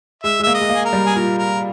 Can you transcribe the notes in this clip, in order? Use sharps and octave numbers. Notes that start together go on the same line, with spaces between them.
G#3 E5
G#3
A#3 E5
D#5
G#3
A#3
G#4
A#4
G3
G#4
A#2 A#4
A#4